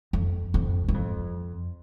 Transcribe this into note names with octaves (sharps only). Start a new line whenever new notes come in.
F2
F2
G2
F2